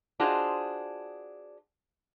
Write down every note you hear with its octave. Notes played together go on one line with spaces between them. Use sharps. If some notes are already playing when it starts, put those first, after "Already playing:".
D4 F4 F#4 G#4 C5 D#5